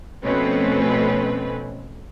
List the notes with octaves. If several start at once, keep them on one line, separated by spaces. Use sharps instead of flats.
B2 F3 A3 C4 C#4 B4